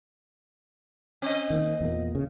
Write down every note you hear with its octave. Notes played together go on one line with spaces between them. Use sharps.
C4 D#5
D#3 A#3
E2 A#2 A#3
C#3